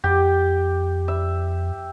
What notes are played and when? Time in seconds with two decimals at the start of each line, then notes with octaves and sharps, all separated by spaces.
0.04 F2 G4
1.08 E5